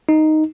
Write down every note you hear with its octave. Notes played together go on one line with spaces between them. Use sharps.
D#4